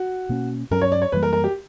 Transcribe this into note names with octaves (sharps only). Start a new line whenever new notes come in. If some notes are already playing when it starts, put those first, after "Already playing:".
Already playing: F#4
B2 A#3 C#4
G2 F#3 C#4 A#4
C#5
D5
C#5
F#2 E3 G3 A#3 B4
A#4
A#4
G4